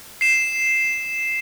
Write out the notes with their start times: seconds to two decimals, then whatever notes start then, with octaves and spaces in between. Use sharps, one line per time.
0.21 C7 E7